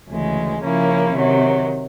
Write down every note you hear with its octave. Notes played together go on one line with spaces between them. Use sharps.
D2 C#3 E3 G#3
C#3 F3 A#3 C#4 E4
C3 D#3 F#3